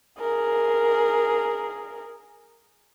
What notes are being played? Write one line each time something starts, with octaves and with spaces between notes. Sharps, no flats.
G#4 A#4